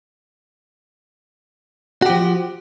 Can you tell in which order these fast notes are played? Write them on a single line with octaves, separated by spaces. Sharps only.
F#4 G4 F3